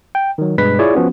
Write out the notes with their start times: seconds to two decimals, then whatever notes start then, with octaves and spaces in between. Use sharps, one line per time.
0.15 G5
0.38 D#3 F#3
0.58 G2 B2 G#3 B4 B6
0.79 E4 F4 G#4 C#5 D5
0.94 F3 B3 C#4 F#4